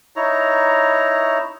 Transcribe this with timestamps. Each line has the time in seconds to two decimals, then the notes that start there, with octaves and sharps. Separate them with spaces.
0.16 D#4 E4 C#5 A#5